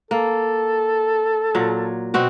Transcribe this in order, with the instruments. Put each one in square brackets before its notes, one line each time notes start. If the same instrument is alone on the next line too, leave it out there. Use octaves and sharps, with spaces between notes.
[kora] A#3 [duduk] A4
[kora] A#2 F#3
B2 C4 F#4